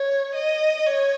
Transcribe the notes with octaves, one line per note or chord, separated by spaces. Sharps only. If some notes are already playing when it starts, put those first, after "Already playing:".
Already playing: C#5
D#5
C#5